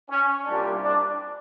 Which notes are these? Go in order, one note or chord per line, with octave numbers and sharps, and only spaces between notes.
C#4
C2 A#2 G3 D4
D4